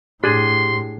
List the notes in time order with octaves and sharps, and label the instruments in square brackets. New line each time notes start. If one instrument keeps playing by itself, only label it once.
[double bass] A2 [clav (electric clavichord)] D4 G#4 [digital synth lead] G4 [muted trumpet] C6